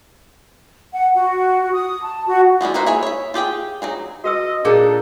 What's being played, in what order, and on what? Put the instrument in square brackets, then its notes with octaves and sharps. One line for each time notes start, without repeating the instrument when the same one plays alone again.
[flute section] F#5
F#4
D#6
A5
F#4
[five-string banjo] F3 G#3 D4 E4
A#3 D#4 F#4 C5 E5
E4 G#4 C#5 E5 G#5
C#5 E5
F4 G4 G#4 G5
F#3 D#4 G#4
[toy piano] F#4 B4 E6 [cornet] D#5
[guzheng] A#2 D#4 A4 [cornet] D4 [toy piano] G#4